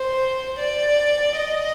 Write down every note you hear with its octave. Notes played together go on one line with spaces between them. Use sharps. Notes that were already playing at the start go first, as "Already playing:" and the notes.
Already playing: C5
D5
D#5